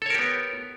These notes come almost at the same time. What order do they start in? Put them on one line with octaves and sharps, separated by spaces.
A4 C#5 A#4 G4 B3